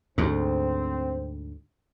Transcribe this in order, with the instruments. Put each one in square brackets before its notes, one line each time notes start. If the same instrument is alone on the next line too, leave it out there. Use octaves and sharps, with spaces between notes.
[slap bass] D2 G#2 [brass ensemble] C4